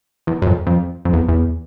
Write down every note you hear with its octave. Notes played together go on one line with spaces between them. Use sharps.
E2
F#2
F2
F2
F2
E2
E2